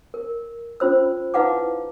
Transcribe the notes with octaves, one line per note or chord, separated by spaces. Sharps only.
A#4
C#4 F4 C5 E6
D#4 E4 B4 F5 F#5 D6